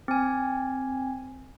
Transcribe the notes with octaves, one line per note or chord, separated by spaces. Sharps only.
C4 G#5